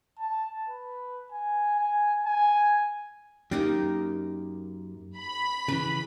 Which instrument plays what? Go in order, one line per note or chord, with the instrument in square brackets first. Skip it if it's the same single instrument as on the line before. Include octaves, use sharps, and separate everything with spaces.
[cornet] A5
B4
G#5
G#5
G#5
[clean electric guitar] F#2 [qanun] A#3 D#4 G4
[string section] B5
[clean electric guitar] C#3 E3 [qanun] B4